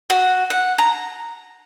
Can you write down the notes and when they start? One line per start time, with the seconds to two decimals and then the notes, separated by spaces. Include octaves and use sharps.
0.10 F#4
0.50 F#5
0.78 A#5